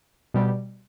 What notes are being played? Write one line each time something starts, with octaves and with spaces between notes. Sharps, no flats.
B2 G3